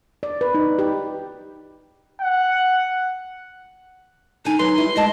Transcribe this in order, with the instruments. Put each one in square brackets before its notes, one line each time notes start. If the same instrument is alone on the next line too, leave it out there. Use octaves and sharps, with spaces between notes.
[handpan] D5
B4
D#4
G4
[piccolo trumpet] F#5
[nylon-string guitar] D3 G#5 [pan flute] D#4
[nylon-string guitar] F#3 B4 [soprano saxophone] C6
[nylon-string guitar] G3 E4
[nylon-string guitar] D2 G#3 A5 [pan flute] D#5